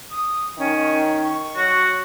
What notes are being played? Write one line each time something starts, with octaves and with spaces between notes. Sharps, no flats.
D#6
D#3 C#4
C#6
F#3 F#4